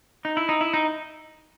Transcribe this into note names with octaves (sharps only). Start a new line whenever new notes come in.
D#4
E4
D#4
E4
D#4